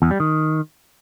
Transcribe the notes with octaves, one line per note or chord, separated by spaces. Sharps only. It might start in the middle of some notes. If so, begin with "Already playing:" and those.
E2
G3
D#3